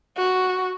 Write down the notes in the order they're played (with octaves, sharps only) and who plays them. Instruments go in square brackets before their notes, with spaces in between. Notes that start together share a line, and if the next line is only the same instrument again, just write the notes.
[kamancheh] F#4